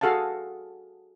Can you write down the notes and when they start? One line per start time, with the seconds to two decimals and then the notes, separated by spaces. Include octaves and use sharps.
0.01 F#4 G#4 A4 F5 F#5 A5